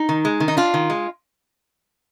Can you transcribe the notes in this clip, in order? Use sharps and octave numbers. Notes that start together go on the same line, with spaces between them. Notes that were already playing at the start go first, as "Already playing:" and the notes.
Already playing: D#4
D#3
G#3
D#3
D#4
D4 F4
D#3
G#3